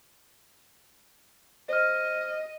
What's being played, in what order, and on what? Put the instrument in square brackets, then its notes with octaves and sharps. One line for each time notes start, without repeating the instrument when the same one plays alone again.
[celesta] C5 F6 [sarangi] D#5